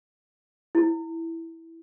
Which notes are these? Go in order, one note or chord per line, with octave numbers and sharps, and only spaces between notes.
E4